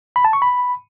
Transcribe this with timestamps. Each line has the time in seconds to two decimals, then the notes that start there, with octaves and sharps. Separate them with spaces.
0.16 B5
0.25 A5
0.33 C#6
0.42 B5